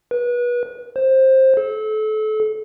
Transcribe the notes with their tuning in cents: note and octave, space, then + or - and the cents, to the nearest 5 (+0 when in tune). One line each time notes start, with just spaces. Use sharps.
B4 -30
C5 +15
A4 -30